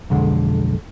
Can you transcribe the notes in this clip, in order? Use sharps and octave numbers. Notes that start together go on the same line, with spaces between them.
B1 F2 D3 G#3